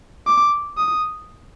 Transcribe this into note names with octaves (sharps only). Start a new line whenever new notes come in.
D6
D#6